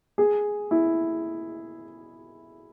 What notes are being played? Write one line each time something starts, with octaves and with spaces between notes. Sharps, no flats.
G#4
E4